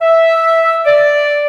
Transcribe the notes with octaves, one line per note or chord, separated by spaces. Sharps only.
E5
D5